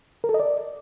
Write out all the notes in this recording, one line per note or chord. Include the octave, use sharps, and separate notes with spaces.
A#4
A4
D#5
D5